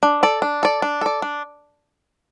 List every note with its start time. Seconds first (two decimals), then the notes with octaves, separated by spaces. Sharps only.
0.03 D4
0.23 A4 D5
0.42 D4
0.63 A4 D5
0.82 D4
1.01 A4 D5
1.22 D4